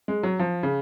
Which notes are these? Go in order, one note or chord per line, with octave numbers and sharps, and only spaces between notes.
G#3
F#3
F3
C#3